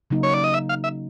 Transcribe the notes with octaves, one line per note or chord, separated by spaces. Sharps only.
C#3 F#3 A#3 D#4
C#5
D5
D#5
E5
F5
E5